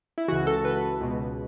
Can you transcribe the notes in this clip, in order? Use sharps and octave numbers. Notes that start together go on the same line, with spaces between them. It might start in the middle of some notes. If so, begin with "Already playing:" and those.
E4
C#2 C#3 E3 F#4
A4
B4
C#2 B2